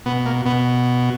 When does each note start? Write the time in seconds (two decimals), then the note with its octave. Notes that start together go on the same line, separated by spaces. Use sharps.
0.06 B2 B3
0.26 A#3
0.46 B2 B3